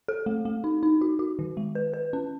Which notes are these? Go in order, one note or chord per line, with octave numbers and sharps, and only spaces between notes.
A4
A3
A3
D#4
D#4
F#4
F#4
D#3
G#3
B4
B4
C#4